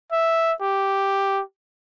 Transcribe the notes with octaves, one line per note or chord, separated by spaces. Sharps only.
E5
G4